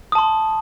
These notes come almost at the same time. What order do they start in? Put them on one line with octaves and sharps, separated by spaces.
D#6 A5 C6